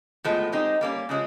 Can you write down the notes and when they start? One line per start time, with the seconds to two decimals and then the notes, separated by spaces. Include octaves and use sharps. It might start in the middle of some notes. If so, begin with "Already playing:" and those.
0.24 A2 F3 G#3 B3
0.52 G#3 C4 D#4 G4
0.81 G3 A#3 C#4
1.09 C#3 F3 G#3 C#4